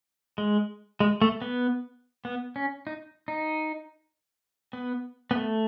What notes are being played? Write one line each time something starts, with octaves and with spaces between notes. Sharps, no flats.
G#3
G#3
A3
B3
B3
C#4
D#4
D#4
B3
B3
A3